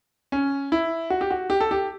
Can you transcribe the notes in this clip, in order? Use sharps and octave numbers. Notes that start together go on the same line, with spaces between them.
C#4
E4
F#4
G4
F#4
G4
A4
G4